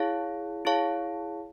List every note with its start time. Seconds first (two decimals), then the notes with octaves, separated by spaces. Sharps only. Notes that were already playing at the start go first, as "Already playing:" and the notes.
Already playing: E4 G#4 C#5 F5 A5
0.65 E4 G#4 C#5 F5 A5